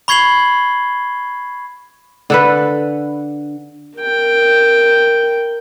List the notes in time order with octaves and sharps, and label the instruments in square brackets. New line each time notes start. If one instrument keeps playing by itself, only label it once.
[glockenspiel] B5 C#6 G#6 C7 F#7 G7
[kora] D3 A4 B4
[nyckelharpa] A#4 G5